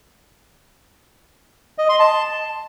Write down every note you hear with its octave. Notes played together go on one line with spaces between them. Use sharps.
D#5
C6
A5